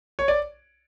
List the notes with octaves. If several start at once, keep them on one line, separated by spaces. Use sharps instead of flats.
C#5
D5